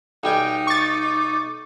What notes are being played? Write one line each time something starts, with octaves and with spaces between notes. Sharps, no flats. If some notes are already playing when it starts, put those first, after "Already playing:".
B1 G3 D#4 G5 G#5
C#6 D6 A6